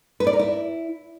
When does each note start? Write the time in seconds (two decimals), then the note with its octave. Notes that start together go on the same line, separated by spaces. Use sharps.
0.20 B4
0.27 D5
0.33 A#4
0.40 E4